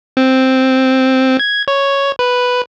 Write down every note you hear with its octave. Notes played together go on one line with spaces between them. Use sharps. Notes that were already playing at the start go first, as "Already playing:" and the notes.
C4
G#6
C#5
B4